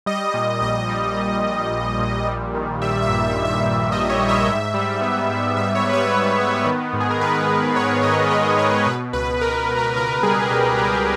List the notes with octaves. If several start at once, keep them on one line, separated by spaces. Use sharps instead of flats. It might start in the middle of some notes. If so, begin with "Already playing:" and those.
G3 D#5
A#2
A#1 D#5
G3
G3
G3
A#1
A#2
G3
D#3
G3 E5
E5
G2
E5
G2
E5
G2 E5
G3 D#5
C#5
G3
E5
G#2 E5
G3
B3
G#2
G#2 E5
C#5
G3
B4
C#5
B3
B3
D#3
G#2
G#4
A#4
G#2 B4
G#2
G#2 C#5
G#2 D#5
G#3 D#5
G#3 C#5
B2 B4
C#2 B4
B2 A#4
B2
A#4
C#2 A#4
G3 G#4
G#4
B2 G4
B2 G4